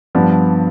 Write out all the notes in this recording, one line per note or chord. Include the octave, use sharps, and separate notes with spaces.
G2 F3 B3 D4